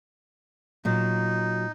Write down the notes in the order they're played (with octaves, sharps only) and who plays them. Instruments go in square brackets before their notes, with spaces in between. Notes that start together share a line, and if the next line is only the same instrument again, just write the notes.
[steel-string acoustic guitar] A#2 F#3 [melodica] D#4